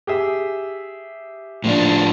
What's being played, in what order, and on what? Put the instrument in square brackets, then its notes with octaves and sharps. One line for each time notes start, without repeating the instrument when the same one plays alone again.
[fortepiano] G4 G#4 E5
[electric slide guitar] A2 F3 D4